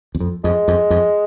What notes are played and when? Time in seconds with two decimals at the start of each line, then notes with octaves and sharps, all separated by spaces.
0.15 E2
0.20 F2
0.44 F2 G#3
0.68 F2
0.90 F2